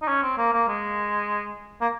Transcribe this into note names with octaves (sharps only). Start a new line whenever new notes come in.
D#4
C#4
C4
A#3
A#3
G#3
A#3